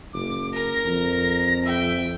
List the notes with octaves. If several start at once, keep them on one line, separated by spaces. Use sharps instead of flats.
F#1 D6
A#4 A#5 A#6
F2
E5 G5